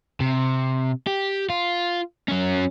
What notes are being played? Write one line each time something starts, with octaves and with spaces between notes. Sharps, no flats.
C3
G4
F4
F#3 C#4